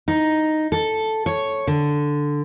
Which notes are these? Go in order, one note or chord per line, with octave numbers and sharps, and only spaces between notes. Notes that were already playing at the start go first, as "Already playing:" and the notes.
D#4
A4
C#5
D3